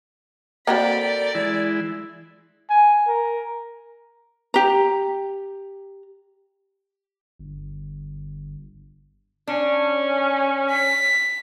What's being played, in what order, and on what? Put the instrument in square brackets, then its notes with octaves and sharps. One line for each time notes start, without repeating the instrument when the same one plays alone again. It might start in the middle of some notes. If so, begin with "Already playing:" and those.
[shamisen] A#3 C4 F#4 [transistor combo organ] A4 A#4 G5 [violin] D5 B5
[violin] D5
[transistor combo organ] E3 G#3 E4
[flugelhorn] G#5
A#4
[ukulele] G4 A#5
[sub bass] G1
[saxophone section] C#4 [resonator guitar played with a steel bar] D4
[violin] B6